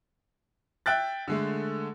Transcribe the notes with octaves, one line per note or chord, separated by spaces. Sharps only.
E5 G5 F#6 A6
D3 G#3 A3